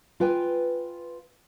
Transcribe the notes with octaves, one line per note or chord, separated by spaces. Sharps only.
F4 B4 G5 G#5